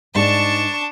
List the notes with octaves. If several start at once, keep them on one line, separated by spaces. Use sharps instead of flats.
G#2 D4 D5 A5 C#6